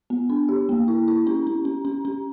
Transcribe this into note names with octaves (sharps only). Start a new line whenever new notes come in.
B3
D4
G4
A#3
E4
E4
C#4
C#4
C#4
C#4
C#4